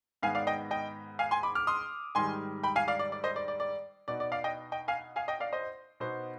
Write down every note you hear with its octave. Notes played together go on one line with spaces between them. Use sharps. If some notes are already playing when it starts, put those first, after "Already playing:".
G#2 D#3 B3 F5 G#5
D5 F5
D#5 G5
D#5 G5
F5 G#5
G#5 C6
B5 D6
D6 F6
C6 D#6
G#2 D#3 G3 G#5 C6
G5 B5
F5 G#5
D5 F5
D5
D5
C5 D#5
D5
D5
D5
B2 B3 D#4 D5
D5
D5 F5
D#5 G5
D#5 G5
F5 G#5
F5 G#5
D#5 G5
D5 F5
C5 D#5
B2 B3 D#4 C5